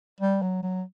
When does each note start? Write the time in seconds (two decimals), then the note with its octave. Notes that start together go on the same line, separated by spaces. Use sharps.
0.21 G3
0.42 F#3
0.63 F#3